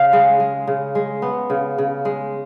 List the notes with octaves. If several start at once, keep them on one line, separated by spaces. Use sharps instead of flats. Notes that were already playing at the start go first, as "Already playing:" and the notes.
Already playing: C#3 F5
G#3
G#3
C#3
G#3
B3
C#3
C#3
G#3